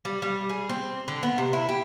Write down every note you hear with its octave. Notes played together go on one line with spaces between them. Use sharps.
G3
G3
G#4
C4
D3
B3
C3
E4
G4